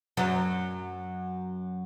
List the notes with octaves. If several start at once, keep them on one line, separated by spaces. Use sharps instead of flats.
F#2 F#3